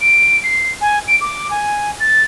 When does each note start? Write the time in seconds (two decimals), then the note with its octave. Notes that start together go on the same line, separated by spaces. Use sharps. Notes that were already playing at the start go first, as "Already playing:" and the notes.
0.01 D7
0.44 C7
0.81 G#5
1.08 D7
1.21 D6
1.51 G#5
2.00 A6